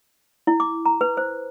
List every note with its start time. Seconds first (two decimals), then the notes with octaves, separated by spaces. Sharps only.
0.47 E4
0.60 D6
0.85 A#5
1.01 B4
1.17 C5